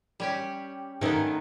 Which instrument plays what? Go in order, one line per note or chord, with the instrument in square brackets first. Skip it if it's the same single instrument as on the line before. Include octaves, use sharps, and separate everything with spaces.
[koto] G3 C#4 G4
[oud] D#3 C#4 A#4 [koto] A3 B3